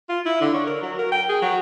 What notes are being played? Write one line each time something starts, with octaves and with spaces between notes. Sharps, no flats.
F4
E4
D3
C#5
A#4
F#3
A#4
G5
G#4
F#3